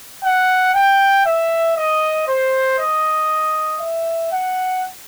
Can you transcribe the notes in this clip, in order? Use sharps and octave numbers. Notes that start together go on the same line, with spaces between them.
F#5
G5
E5
D#5
C5
D#5
E5
F#5